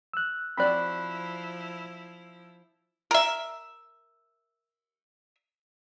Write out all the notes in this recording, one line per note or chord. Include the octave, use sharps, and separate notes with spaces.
E6 F#6
F3 C4 E4 F#4 D5 B5 F#6
A#4 E5